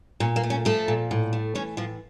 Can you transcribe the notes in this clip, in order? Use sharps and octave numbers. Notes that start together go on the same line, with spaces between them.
A#2 C#4
A#3
A3
C#4
F3 A3 A4
A#2
A2
A3
E3 C#4 C#5
A2 F3 F4